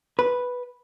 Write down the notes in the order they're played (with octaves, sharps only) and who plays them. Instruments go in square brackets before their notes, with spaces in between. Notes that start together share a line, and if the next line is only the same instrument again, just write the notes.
[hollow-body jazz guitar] B4